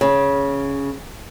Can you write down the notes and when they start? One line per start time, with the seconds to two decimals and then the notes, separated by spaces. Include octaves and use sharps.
0.01 C#3